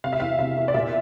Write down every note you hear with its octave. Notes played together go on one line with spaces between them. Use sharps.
C3 F5
E5
E2 F5
C3 E5
E2
D5
A#2 E5